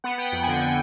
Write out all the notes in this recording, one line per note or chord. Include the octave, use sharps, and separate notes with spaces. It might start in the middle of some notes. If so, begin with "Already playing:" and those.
B3 F#5
B3 G5
F2 G5
D3 G#5
G5
D3